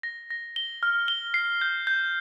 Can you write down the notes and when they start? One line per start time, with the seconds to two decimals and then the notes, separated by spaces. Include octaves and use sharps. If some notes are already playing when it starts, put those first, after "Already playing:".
0.03 A#6
0.30 A#6
0.56 G7
0.83 F6
1.08 G7
1.34 C7
1.61 G6
1.87 G6